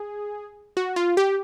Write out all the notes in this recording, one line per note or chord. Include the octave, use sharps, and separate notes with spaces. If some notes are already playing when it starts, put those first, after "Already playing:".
Already playing: G#4
F#4
F4
G4